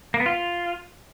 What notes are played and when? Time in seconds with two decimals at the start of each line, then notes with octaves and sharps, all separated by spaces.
0.14 A#3
0.20 B3
0.26 F4